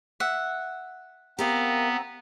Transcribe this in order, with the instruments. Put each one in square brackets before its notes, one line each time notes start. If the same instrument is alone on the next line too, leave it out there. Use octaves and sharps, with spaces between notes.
[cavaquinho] E5 F#5
[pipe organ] B3 [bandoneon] C4 A#5 [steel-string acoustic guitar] G4 A#4 F5